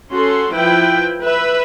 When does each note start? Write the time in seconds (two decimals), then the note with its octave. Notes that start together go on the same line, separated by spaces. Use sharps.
0.11 C#4 F#4 A4 C6
0.53 F3 E4 B4 G5
1.23 B4 E5